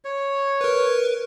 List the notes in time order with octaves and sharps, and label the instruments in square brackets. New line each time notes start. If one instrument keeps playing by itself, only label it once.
[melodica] C#5
[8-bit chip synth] A#4 B4